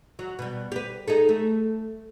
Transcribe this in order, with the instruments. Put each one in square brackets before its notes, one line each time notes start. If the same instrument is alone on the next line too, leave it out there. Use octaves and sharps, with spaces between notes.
[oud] F#3
B2 G3
G4 B4
D#4 G#4 A4
A3